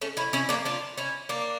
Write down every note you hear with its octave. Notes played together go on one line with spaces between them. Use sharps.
A3 C#4
C#4 E4
C#4 E4
A#3 D4
D4 F4
C#4 E4
A#3 D4